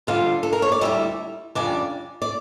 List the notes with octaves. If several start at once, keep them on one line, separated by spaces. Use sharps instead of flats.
F2 D3 G3 F4 F5
A4
A#4
C#5
D5
D2 C#3 G3 E4 E5
F2 C#3 G3 D4 D5
D5